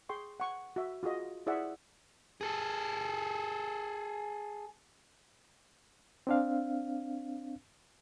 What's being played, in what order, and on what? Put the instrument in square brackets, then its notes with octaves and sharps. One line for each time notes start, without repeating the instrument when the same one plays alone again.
[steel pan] G#4 G5 C6 C#6
F#5 C#6
F#4 E5
F4 F#4 G#4 D#5
E4 G#4 C5 D5 E5 F#5
[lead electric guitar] G#4 A4
[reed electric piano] C4 D4 F5